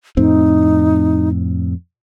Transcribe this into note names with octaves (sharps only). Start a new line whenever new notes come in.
F2 A2 C4 D#4